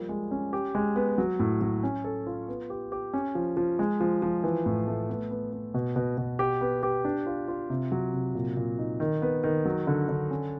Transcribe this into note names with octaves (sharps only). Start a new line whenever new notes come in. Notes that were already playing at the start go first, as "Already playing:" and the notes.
Already playing: F3 G3 A#3
G#3
C#4
G4
G#3
B3
F#3
A2
F#3
C#4
A4
F4
B3
G4
G4
C#4
F3
F3
G#3
F3
F3
E3
A2
A3
B3
B3
B3
B2
B2
B2
G4
B3
G4
D4
F4
F4
C3
F#3
C3
A#2
A#2
D#4
D#3
B3
D#3
F#3
D3
D3
C#4